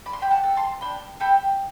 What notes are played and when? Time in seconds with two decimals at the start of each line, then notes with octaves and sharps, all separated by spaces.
0.06 D4 B5
0.13 C6
0.22 G5 B5
0.31 F#5 A5
0.43 A4
0.57 A5 C6
0.81 D4 G5 B5
1.20 A4 G5 B5